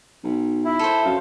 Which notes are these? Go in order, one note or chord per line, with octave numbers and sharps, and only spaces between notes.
B1
E4
A4 C5
F#2 F5